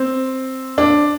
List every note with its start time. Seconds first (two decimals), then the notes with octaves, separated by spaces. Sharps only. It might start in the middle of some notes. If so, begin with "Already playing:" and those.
Already playing: C4
0.78 D4